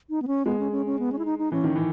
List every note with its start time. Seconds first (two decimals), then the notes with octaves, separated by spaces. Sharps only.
0.10 D#4
0.22 B3
0.27 C#4
0.46 G#3 B3
0.59 C#4
0.72 C#4
0.86 C#4
0.99 B3
1.12 C#4
1.19 E4
1.25 D#4
1.39 D#4
1.52 E3 C#4
1.64 D#3
1.76 E3